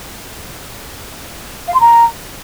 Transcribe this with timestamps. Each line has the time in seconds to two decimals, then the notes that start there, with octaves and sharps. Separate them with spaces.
1.67 F5
1.74 C6
1.80 A#5